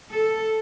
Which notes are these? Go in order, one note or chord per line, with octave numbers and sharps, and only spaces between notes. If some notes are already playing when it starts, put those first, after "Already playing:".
A4